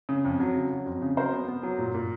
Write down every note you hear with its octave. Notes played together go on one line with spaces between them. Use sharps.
C#3
F2
F#3
C#3
F#3
F2
C#3
F#3 A#4 C5
B3
B3
F#3
A#2
A#2